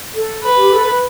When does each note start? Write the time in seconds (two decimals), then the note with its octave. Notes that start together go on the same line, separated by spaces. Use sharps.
0.15 A4
0.44 B4
0.57 G4
0.73 A4
0.87 B4